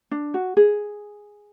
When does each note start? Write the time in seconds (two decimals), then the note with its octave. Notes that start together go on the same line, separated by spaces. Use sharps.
0.11 D4
0.34 F#4
0.57 G#4